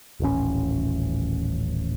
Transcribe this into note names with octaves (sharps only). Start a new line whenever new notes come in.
D#1 A1 C#4